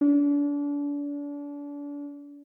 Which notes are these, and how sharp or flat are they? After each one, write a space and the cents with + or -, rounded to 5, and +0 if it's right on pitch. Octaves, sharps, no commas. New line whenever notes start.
D4 -35